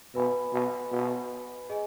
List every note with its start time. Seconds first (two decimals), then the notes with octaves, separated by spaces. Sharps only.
0.15 B2 B4 G#5 B5
0.53 B2
0.92 B2
1.69 G#4 D#5 G#5